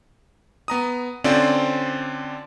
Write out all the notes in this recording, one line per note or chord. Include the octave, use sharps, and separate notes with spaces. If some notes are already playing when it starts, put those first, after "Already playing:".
B3 A#5 D#6
D3 C4 C#4 F4 C5 D5